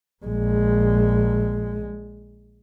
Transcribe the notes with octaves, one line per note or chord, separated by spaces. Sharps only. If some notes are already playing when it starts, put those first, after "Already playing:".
A#1 G#3